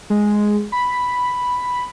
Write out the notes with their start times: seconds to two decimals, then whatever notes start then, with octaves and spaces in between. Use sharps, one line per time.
0.10 G#3
0.72 B5